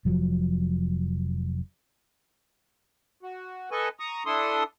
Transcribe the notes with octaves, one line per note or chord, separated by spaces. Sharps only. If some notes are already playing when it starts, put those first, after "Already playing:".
F1 F3 F#3
F#4
A4 B4 D#5 G#5 C#6
A#5 C#6 D#6
D4 E4 A4 C6 D#6